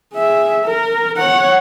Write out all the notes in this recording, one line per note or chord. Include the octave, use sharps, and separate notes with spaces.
G#4 E5
A#4
C#5 F#5